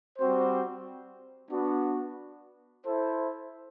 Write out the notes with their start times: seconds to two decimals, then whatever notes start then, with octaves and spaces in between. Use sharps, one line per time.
0.18 G3 C4 F#4 C5
1.51 B3 D4 F#4
2.85 E4 A4 C5